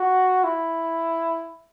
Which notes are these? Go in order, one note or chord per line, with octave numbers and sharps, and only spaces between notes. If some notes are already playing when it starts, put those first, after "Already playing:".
Already playing: F#4
E4